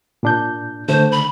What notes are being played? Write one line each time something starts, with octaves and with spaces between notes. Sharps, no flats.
A#2 D4 G6
D3 A3 C5
B5